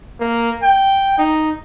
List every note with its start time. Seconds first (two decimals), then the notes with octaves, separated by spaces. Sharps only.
0.20 A#3
0.63 G5
1.18 D#4